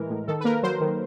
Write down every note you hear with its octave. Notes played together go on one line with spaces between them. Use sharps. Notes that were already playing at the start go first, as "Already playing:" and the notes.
Already playing: A2 E3 G#3 A#4
A2
D#3 A4
B4
A#3 A#4
F#3 C5
D#3